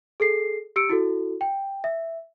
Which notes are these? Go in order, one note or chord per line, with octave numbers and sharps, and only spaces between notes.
G#4 A4 C7
G4 E6 C#7 D7
E4 F#4 A4
G5
E5